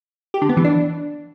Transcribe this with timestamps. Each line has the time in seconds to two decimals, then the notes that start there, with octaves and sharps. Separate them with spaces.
0.34 G4
0.42 D3
0.49 B3
0.57 E3
0.64 D4